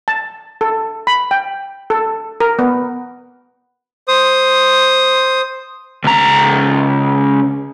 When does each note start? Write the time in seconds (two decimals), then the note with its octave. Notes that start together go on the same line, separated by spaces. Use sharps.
0.08 A5
0.61 A4
1.07 B5
1.31 G5
1.90 A4
2.40 A#4
2.59 B3
4.08 C5 D#6
6.04 C#2 A#5